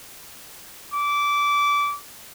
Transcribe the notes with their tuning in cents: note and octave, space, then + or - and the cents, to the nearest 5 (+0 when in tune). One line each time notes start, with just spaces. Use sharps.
D6 -20